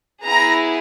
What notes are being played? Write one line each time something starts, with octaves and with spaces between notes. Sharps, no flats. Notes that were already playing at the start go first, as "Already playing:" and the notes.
B3 E4 G#4 A#5